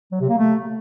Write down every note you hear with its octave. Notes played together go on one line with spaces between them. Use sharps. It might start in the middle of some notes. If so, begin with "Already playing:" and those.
F#3
C3
A#3
A3